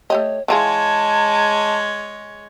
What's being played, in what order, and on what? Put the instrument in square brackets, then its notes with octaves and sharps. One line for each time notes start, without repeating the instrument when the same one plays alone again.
[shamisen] A3 G4 D#5 [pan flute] C#5
[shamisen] E3 F4 G#4 [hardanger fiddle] G#3 C#5 [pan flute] A5